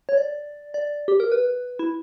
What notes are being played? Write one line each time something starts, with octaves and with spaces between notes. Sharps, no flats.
C#5
D5
D5
G4
A#4
B4
E4